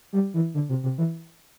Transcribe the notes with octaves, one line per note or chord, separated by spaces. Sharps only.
G3
E3
D3
C3
C3
E3